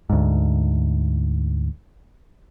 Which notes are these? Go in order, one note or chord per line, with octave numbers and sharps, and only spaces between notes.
D2 G#2